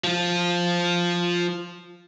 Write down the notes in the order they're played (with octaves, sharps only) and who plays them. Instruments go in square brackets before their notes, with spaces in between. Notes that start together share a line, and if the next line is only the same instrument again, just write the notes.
[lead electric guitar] F3 F4